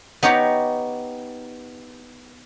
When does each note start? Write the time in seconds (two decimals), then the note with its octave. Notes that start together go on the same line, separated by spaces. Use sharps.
0.23 B3 D#4 G4 C#5 A#5